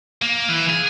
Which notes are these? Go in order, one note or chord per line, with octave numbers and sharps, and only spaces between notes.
A#3
E3
G#4